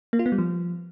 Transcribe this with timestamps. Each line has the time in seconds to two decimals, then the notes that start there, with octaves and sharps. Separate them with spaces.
0.13 A#3
0.19 F4
0.26 B3
0.32 G3
0.38 F3